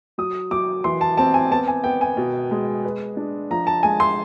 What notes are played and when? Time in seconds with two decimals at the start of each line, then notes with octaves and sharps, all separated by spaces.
0.18 F#3 D#6
0.51 F#3 D6
0.84 E3 C6
1.01 A5
1.17 C4 A5
1.34 G#5
1.51 B3 A5
1.68 G#5
1.84 B3 G5
2.01 G#5
2.17 B2
2.51 G#3
2.84 B4
3.17 D4
3.51 F3 A#5
3.67 A5
3.83 G#3 G#5
4.00 C6